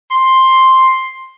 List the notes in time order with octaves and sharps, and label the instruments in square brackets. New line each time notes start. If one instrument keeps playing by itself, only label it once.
[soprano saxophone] C6